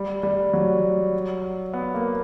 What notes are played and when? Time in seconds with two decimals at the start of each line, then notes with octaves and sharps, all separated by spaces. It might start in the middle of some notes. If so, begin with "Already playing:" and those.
Already playing: G3
0.23 G3
0.53 F#3
1.73 B3
1.94 A#3